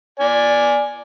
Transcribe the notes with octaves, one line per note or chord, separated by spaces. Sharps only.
D5 G#5